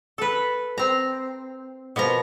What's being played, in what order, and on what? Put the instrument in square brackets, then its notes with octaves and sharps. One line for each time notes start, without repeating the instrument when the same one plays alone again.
[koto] A4 B4
C4 A#5
B2 F3 A#4 A#5